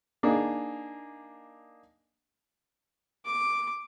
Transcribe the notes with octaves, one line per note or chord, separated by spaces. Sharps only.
A#3 D4 D#4 G#4
D6